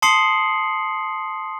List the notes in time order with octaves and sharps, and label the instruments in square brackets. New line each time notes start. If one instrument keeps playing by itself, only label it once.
[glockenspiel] A5 C6 D#6 C7 C#7 F#7